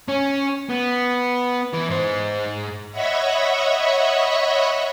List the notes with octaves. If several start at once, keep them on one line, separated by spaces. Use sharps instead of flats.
C#4
B3
E3
G#2 C5
C#5 D#5 E5 F#5 B5 C#6